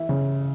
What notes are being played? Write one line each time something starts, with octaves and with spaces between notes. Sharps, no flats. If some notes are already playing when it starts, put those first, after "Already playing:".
Already playing: E3 E5
C#3